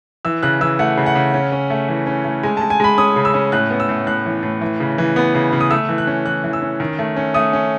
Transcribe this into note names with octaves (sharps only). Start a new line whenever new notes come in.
E3 E6
C#3 F#6
E3 E6
A3 F#5
C#3
F#5
C#3
C#4
C#4
A3
E3
C#4
A3
G#3 G#5
G#3 A5
G#5
G#3 B5
C#4 D#6
C#3
E6
C#4
A2 F#6
B3
E6
A2
A2 F#6
E3
A2
E3
C#3
E3
B3
C#3
C#3
D#6
A3 E6
E3
F#6
C#4
E3 F#6
E3
E6
C#4
D#3
A3
C#4
A3 D#6
C#4